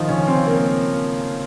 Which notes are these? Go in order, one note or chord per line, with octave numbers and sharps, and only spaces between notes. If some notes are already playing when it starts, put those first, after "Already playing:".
Already playing: D#3 F3 D#4 F4
C#3 C#4
C4
A#3